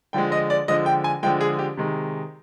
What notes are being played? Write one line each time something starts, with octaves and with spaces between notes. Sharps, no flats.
D3 F3 G#3 G5
D#5
D5
D3 F3 G#3 D#5
G5
G#5
D3 F3 G#3 G5
G#4
G4
C3 D#3 G#3